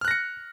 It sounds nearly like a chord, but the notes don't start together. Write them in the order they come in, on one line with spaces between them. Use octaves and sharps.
F6 F#6 A#6 C#7